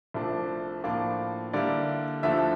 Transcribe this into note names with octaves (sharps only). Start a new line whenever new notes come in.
C2 C3 F3 A3 D4
A2 F3 A#3 D4 F4
D3 G3 A#3 E4 D5
D2 D3 F3 A3 E4 E5